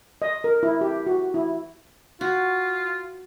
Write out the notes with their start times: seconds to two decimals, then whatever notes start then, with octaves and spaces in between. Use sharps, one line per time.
0.22 D#5
0.44 A#4
0.63 E4
0.81 G4
1.07 F#4
1.34 E4
2.21 F4 F#4